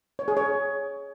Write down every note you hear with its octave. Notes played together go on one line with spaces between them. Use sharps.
C#5
G#4
C#5